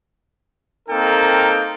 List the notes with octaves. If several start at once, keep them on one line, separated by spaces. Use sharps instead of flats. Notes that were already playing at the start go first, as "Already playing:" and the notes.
A#3 C4 D#4 A4 A#4 G5